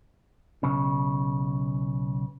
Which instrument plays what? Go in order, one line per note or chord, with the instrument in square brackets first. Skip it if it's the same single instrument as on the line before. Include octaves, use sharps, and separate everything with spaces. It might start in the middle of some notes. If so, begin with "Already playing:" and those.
[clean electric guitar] B1 C#3